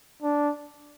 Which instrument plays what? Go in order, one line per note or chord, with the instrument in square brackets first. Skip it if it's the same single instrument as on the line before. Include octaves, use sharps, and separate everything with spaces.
[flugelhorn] D4